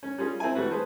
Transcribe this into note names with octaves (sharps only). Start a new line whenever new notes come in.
C#4
G3 C#4 F4 G#4
C4 E4 G#5
E3 G3 A3 F#4 B4
G#4 B4 C5 A5